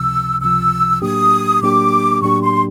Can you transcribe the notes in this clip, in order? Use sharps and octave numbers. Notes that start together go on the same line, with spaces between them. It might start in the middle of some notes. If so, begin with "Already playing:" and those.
Already playing: C#2 C3 F3 E6
C#2 C3 F3 E6
A2 F#3 A#3 D4 G4 D#6
A2 F#3 A#3 D4 G4 D6
A2 F#3 A#3 D4 G4 C#6
C6